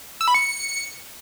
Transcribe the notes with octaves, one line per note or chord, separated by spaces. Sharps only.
E6
B5
C#7